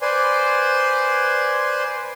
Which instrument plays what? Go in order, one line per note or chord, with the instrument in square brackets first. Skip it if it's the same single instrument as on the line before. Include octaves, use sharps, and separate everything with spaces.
[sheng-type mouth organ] B4 C5 D5 G#5 C6